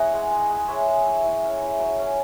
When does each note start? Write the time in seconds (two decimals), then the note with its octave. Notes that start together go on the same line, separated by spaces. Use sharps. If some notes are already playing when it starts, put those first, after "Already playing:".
Already playing: B3 E4 G#4 C#5 D#5 F#5 G#5
0.13 G#3
0.32 G#3
0.49 G#3
0.68 G#3 C#5 E5
0.87 G#3
1.06 E4
1.24 E4
1.43 C#4
1.61 E4
1.79 F#3
1.99 C#4